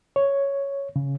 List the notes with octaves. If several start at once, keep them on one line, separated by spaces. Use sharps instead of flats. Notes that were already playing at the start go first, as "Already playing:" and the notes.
C#5
C#3